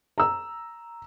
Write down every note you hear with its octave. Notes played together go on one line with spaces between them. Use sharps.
A#5 E6